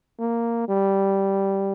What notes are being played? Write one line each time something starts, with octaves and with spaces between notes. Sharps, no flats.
A#3
G3